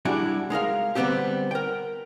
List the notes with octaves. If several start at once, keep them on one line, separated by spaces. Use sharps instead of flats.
G3 D4 E4 F#4 G#4
G#3 D#4 A#4 F5
D3 G3 G#3 B3 C4 G4
A#4 G5